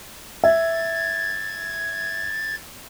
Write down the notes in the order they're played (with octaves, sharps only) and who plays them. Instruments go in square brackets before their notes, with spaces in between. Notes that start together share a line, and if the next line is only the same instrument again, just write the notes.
[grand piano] E5 [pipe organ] G#6 A6